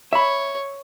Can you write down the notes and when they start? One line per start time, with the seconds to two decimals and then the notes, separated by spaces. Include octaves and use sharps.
0.13 C#5 E5 B5